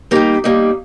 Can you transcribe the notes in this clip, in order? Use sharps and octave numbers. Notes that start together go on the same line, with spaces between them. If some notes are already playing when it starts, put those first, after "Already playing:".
G3 A#3 D#4 G4
G3 A#3 D#4